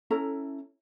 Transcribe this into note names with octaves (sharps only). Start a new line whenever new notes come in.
C#4 E4 A4 A#5